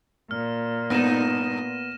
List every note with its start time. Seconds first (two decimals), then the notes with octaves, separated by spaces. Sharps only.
0.31 A#2 F6
0.90 G2 B3 D#4 A#6 D#7 E7